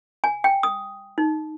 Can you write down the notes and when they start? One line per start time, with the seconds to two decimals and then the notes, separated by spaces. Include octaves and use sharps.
0.24 G#5
0.44 G5
0.63 D#6
1.18 D#4